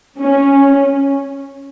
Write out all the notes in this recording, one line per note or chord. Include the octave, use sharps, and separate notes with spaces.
C#4